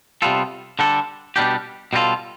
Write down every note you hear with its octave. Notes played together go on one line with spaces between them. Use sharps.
C3 G3 B3 F4 A4
D3 G3 D4 A4
B2 G3 D4 G4
B2 G3 D4 F4 A4